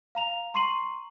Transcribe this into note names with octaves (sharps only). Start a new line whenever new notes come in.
F5 A#5 F7
A#5 C6 C#6 C7 D#7 F#7